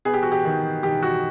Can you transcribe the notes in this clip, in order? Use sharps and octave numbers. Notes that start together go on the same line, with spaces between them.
B3 G#4
G4
F#4
G4
D#3
D#3 G4
F#4